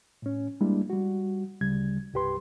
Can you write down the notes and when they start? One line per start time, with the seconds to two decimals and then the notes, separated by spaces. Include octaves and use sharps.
0.22 A2 C#4
0.61 G3 G#3 A#3 D4 E4
0.90 G3 F#4
1.61 D2 C#3 G3 G#6
2.14 C2 G2 G4 B4 C6